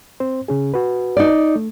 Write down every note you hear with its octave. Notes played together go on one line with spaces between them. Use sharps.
C4 C5
C#3 C#4 G#4
F#4 B4
D#4 D5
A3